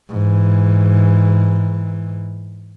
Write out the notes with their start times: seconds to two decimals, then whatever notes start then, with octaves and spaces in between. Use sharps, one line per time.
0.10 G#2 E3